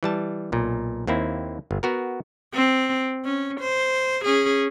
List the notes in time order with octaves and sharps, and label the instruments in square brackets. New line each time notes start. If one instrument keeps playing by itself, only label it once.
[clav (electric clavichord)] E3 G3 A5
B1 A#2
D#2 A#3 C4 E4
G1
B3 F#4 A#4
[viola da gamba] C4
C#4
C5
C#4 G#4